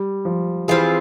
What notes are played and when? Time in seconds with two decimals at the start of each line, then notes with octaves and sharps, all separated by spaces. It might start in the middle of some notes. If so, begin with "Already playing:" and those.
Already playing: G3
0.25 F3
0.68 E3 G3 C4 F4 G#4